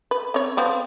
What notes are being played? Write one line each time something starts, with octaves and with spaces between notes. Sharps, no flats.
B4
C4 C#5
F3 B3 C4